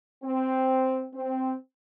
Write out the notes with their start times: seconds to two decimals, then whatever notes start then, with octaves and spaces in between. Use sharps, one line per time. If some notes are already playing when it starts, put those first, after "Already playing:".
0.23 C4
1.14 C4